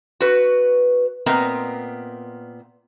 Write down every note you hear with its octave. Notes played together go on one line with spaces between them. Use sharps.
F#4 B4
A#2 B3 C4 A#4 D#5 A#5